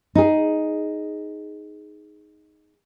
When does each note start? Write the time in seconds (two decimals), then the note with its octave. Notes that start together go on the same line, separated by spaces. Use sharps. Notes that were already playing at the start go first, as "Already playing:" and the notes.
0.15 D#4 G#4